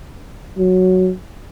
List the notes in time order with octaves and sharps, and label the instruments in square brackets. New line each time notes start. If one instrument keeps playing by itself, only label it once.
[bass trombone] F#3